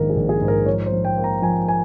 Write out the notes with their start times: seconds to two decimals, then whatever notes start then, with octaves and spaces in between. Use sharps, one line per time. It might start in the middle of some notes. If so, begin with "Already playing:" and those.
Already playing: A#1 G#2 D#3 A#3 A#4
0.10 G#4
0.16 A#1
0.29 G#4
0.41 G#2
0.48 A#4
0.66 F3 C#5
0.86 C5
0.92 F3
1.05 G5
1.17 A#3
1.24 A#5
1.42 F3 G#5
1.68 G#5